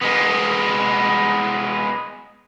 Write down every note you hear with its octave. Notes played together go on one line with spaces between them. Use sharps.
G#3 B3